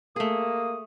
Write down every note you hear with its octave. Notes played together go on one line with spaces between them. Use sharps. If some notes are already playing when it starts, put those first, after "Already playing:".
A3 A#3 G#4 D#6